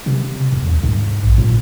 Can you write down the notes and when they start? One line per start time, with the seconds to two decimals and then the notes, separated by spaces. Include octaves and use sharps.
0.06 C3
0.52 E2
0.67 D2
0.83 G#2
1.23 A#1
1.38 A#2